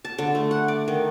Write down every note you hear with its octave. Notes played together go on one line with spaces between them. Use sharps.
A5
D3
A3
F#5
D5
D#3